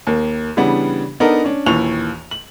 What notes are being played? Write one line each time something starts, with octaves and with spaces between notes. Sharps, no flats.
D#2 A#3
C#3 E3 G3 B3 D4
B3 D4 D#4 A4 A#4
C#4 D4
A#1 D#2 E3 C#6 F7
F#7